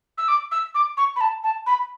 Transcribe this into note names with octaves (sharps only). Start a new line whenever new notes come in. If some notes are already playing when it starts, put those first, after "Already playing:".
E6
D6
E6
D6
C#6
B5
A5
A5
B5